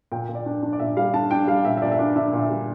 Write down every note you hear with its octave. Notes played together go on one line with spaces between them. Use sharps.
A#2 G5
A#2
D5
D4
D4
D5
A#2 E5
G3 F5
D4 A5
D4 G5
G3 F5
A#2 E5
E5
A#2 D5
E5
D4 D5
D4 E5
A#2
E5
G3